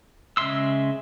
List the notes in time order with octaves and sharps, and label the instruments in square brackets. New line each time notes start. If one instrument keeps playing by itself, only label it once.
[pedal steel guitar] C#3 G#3 E5 C6 E6